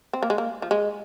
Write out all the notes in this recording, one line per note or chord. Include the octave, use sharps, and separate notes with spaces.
C4
A#3
G#3
A#3
F3
G#3